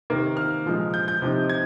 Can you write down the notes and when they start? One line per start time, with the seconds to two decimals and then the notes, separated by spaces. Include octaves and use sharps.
0.10 C3 D#3 A#3
0.37 F6
0.66 A#2 F3 G#3
0.94 G6
1.08 G6
1.22 C3 F3 C4 D#4
1.49 G#6